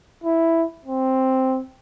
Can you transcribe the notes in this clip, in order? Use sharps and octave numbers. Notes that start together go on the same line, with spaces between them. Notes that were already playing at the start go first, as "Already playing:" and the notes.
E4
C4